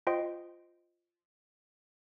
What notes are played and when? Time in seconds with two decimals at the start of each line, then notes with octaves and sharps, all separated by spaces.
0.07 F4 C5 D#5 G5 C6